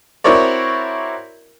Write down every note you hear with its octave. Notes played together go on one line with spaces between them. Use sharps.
C4 E4 F#4 A#4 C#5 D5